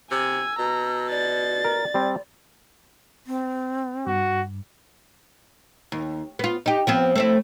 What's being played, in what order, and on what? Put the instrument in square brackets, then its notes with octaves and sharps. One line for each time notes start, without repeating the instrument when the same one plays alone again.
[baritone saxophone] C3 [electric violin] G#5 [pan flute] E6
[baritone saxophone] B2 [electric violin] A#5
[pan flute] D5 [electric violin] A6
[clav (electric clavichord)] A#4
G3 C4
[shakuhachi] C4
[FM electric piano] G2 [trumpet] F#4
[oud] D#2
B3 F4
D#4 G4
F3 B3 C4
A3 C4 E4